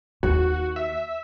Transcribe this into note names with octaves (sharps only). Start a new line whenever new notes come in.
D#2 F#4
E5